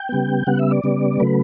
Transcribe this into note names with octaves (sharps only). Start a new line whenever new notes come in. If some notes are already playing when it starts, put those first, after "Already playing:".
Already playing: G5
C#3 G3 B3
C#3 G3 B3 F#5
E5
D5
C#3 G3 B3
C#3 F#3 A3 B4